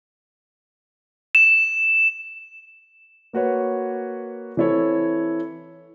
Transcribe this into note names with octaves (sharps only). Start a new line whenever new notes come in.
E7
A#3 F#4 B4 C#5
E3 C4 E4 A4 C#5